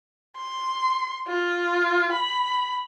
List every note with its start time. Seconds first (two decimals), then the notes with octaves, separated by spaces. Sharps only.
0.36 C6
1.27 F4
2.12 B5